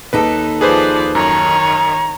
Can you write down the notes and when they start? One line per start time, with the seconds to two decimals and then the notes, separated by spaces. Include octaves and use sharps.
0.13 D#2 D#4 A4 B4
0.61 F3 G#4 B4 C5 D5
1.15 F#2 D#3 C#5 A#5